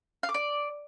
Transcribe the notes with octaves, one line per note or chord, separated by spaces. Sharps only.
F5
D6
D5